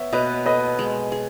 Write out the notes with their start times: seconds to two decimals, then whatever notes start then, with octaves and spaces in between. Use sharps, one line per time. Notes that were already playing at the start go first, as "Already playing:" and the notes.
Already playing: B3 C#5 E5
0.13 B2 B4 D#5
0.45 A4 B4 D#5
0.79 G#3
1.12 G#4